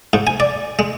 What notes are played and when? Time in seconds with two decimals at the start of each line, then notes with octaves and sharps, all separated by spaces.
0.13 G#2
0.27 G#5
0.40 D5
0.79 G#3